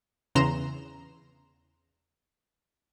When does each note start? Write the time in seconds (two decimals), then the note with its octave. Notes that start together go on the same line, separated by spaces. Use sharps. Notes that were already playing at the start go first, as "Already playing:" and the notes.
0.35 E2 C#3 A#5 C6 E7